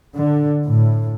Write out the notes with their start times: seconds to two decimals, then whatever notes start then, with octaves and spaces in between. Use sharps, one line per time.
0.15 D3
0.66 A2